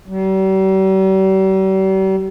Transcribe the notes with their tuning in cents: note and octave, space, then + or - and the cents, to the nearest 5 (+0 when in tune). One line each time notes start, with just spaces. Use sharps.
G3 -45